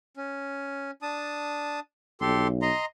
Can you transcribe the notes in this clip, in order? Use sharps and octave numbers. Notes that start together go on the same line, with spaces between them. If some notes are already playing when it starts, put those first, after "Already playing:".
C#4
D4 A5 D#6
B1 G4 A4 C6
D#5 A#5 C6